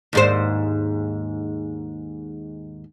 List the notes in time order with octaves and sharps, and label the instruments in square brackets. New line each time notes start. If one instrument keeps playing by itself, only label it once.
[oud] D#2 G#2 C5